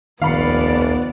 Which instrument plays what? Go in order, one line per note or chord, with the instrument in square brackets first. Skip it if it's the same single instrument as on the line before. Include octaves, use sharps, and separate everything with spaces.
[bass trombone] F1 [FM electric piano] A#1 D#2 [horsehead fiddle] B3 D5 [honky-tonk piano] F5 B5 C#7